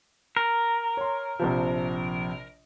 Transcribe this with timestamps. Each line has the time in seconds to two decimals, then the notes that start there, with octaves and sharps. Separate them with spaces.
0.37 A#4
0.97 C#5 C6
1.39 A#1 C3 F3